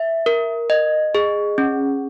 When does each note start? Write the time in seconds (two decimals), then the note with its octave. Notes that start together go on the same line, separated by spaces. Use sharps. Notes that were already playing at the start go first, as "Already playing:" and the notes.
Already playing: E5
0.26 A#4
0.70 D#5
1.15 G#4
1.58 C#4